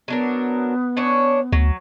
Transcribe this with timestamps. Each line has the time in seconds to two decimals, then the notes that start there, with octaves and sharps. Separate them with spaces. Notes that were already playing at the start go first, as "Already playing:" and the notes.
0.08 F#3 B3 D4 A#4
0.97 C#4 D4 C#5
1.52 D2 F#3